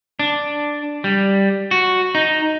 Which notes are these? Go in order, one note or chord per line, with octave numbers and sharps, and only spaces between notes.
D4
G3
F#4
D#4